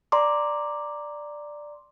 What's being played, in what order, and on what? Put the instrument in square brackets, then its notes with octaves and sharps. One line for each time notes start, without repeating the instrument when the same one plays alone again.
[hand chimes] D5 A#5 C6 D6